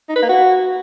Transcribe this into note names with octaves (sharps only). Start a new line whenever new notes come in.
D#4
B4
A#3
F#4